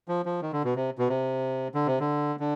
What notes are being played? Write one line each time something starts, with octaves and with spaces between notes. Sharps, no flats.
F3
F3
D#3
D3
B2
C3
B2
C3
D3
C3
D3
D3